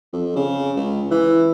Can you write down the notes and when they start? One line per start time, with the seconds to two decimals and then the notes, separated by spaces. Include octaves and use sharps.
0.13 F2
0.36 C#3
0.76 C#2
1.11 E3